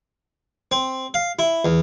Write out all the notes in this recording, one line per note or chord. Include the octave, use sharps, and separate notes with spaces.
C4
F5
E4
E2